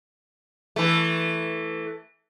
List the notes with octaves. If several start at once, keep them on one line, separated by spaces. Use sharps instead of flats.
E3 A3